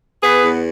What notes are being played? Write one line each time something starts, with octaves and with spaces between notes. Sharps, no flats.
B3 G#4 B4
E2